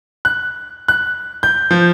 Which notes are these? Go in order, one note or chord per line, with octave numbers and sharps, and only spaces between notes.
F#6
F#6
G6
F3